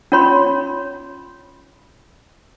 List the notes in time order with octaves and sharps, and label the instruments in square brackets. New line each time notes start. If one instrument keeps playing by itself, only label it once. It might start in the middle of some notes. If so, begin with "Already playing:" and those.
[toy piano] C#4 F4 C#5 B5 C6